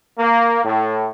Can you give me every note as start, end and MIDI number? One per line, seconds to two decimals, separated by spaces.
0.19 0.62 58
0.64 1.09 45